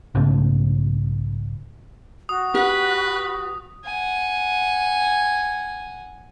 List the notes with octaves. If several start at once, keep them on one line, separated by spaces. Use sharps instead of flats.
B1 G#2 C#3 A3
F#4 D#6
G4 B4 F#5
F#5 G#5